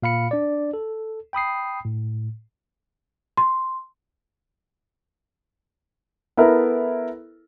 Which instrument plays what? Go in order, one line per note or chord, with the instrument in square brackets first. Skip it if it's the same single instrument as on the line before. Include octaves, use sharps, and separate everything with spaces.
[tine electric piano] A#2 F5 B5 C#7
D4 D5
A4
G5 B5 D#6 C7
A2
[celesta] C6
[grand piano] B3 E4 A4 A#4